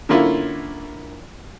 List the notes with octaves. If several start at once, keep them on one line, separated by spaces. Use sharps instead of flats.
D3 A#3 C#4 E4 F4